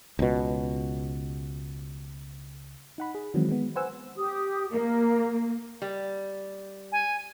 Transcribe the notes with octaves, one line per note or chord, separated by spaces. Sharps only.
C#2 B2
D#4 F#5 B5
G#4
D#3 E3 F#3 G#3 C4
G#3 B3
B4 C5 F#5 G#5 E6
G4 D#6
A#3 A#4
G3
G#5